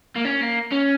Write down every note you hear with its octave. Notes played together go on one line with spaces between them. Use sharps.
A#3
C#4
A#3
C#4